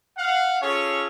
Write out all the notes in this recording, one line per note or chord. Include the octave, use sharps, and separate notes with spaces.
F5 F#5
C#4 F4 G#4 A4 C#5